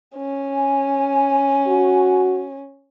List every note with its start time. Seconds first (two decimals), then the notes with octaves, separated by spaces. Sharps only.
0.16 C#4
0.54 G#5
1.67 F#4